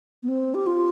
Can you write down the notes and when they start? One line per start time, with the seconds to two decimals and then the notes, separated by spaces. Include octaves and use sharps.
0.23 B3
0.28 C4
0.54 G4
0.67 F4